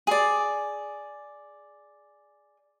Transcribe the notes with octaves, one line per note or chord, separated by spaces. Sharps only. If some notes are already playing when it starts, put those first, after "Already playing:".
G#4 D5